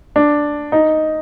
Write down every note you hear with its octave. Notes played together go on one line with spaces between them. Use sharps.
D4
D#4